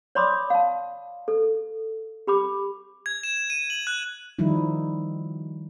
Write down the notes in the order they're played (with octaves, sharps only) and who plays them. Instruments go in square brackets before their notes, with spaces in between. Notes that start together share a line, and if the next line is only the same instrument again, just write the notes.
[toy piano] C#5 D5 B5 C6 D6 D#6
F5 A5
A4
G4 B5 D6
[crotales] G#6
E7
D#7
F#7
F#6
[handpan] D#3 F3 G3 D#4 E4